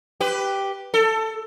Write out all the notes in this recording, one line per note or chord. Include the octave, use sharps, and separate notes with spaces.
G4 B4
A4